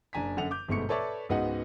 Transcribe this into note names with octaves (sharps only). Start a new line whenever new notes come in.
F#1 D4 G#5 A#5 B6
F#2 D3 F#5 F7
D6 G6
G1 G#2 B2 A3 C#6 C#7
A4 B4 C#5 D5 E5 A5
C#2 G#2 B3 D#4 F#4 F#5